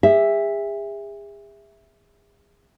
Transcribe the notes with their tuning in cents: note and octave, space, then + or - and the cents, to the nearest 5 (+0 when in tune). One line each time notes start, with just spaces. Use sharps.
G#4 -40 E5 +0